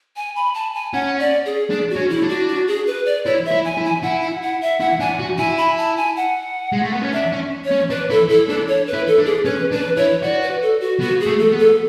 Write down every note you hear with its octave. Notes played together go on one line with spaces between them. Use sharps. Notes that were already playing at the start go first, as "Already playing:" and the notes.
G#5
B5
A5
G#5
C#4 F#5
D5
G#4
D4 G#4
F#4
C#4
E4
D4
F#4
F#4
G#4
B4
D5
E4 C#5
E5
E4
G#5
E4
G#5
E4 F#5
F#5
F#5
E5
E4 F#5
D4 G#5
F#4
E4 G#5
B5
A5
G#5
F#5
G#3
A3
B3
C#4
D4 E5
C#4
C#5
C#4
D4 B4
E4 A4
E4 A4
D4 A4
C#5
B4
E4
A4
D4
G#4
C#4 B4
D4 B4
E4 C#5
F#4 D5
B4
A4
F#4
B3 F#4
G#4
A3
A4
B3
A4